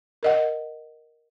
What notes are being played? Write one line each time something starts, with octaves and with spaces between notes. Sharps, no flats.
A#4 D#5 F#5